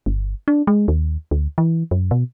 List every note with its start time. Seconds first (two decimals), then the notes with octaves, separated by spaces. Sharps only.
0.06 G1
0.48 D4
0.67 G#3
0.88 D#2
1.31 D2
1.58 E3
1.91 F#2
2.11 B2